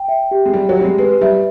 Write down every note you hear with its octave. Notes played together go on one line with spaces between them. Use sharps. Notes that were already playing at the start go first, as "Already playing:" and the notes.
Already playing: G5
E5
G4
G#3
G3 G4
F#3
G3 G4
G#3
G#3 B4
G3 E5